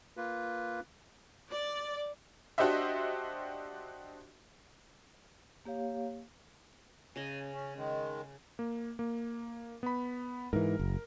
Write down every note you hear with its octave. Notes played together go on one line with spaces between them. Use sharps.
A#3 F4 B4
D5
D4 F#4 G4 C5 D#5 E5
A#3 G4 C#5 F5
C#3 D#5 G#5
C#4
D#3 G#3
A#3
A#3
B3 B5
G#2 E3 A#4
F#1